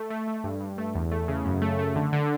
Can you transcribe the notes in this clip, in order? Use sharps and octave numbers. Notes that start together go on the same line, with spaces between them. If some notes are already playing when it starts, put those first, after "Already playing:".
Already playing: A3
A3
A3
G2
G2
A3
E2
A3
C#3
F#2
A3
A3
D3
D3